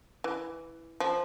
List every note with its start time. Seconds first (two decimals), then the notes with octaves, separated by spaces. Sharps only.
0.24 E3
1.00 F3